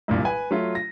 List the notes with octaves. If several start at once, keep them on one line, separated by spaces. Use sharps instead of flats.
E1 C2 G2 A#2
B4 G#5
F#3 A3 F4
A#6